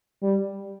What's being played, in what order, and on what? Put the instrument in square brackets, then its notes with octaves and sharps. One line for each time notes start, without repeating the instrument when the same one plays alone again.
[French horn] G3